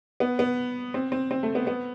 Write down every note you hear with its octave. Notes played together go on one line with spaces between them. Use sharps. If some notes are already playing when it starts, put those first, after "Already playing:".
B3
B3
C4
C4
C4
A3
B3
B3